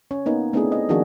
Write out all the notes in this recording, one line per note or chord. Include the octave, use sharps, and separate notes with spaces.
C#4 C#5
A#3 B3 D#4
A3 B3 C4 D4 E4 G#4
D#5
D#3 F3 A#3 D4 F#4 G#4